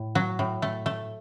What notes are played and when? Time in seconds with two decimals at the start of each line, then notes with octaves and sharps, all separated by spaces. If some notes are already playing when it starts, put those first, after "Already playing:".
Already playing: A2
0.15 F#3
0.39 A2
0.62 A3
0.86 A3